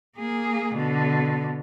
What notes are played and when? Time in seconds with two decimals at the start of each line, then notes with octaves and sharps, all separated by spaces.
0.17 A#3 G#4
0.74 B2 D3